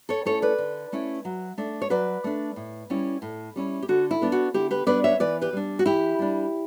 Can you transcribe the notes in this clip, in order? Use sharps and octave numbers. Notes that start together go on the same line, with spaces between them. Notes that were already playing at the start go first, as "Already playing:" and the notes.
A4 C#5
A3 C#4 E4 A4 C#5
B4 D5
D3
A3 C#4 E4
F#3
A3 D4
C#5
F#3 B4 D5
A3 D4
A2
G3 C#4 E4
A2
G3 C#4 E4
G4
D3 F#4
E4
G3 B3 D4
F#4
D3 E4 G4
G4 B4
G3 B3 D4 B4 D5
C#5 E5
E3 B4 D5
G4 B4
G3 D4
F#4
E3 E4 G4
G3 D4